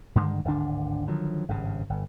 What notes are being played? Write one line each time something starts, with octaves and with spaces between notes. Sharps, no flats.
G2 D3 D#3 G#3
D1 G#1 D3 D4
D3 D#3 F3 F#3
G#1 G2 C#3
G1